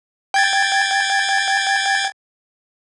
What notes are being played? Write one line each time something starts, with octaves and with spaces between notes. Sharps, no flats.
G5 G#6 A6